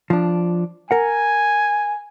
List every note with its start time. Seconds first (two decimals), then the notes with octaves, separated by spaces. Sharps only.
0.10 F3 D4
0.91 A#4 F#5 G#5